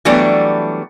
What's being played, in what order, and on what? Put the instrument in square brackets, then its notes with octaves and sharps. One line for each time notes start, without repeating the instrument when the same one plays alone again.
[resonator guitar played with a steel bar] E3 F#3 G3 A3 B3 D4